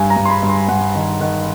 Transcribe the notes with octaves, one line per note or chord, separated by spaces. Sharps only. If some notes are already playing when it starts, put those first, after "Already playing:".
Already playing: G2 G#5
A#5
G2
C6
B5
G2
C6
G2 F#5
D#3
D#3 F#5